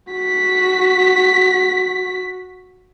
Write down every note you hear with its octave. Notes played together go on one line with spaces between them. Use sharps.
F#4 B6